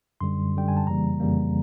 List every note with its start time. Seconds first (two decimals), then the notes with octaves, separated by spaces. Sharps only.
0.20 F#2 D3 G3 C6
0.54 F#2 D3 G3 G5
0.68 G#5
0.77 A5
0.86 F2 C#3 E3 G3 A#3 A#5
1.20 F2 C#3 E3 G3 A#3